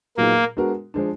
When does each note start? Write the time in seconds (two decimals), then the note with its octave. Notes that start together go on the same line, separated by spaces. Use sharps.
0.17 A#2 F#3 A#3 B3 D#4 G#4
0.57 G#3 B3 D4 F#4 A#4
0.94 F3 G#3 D4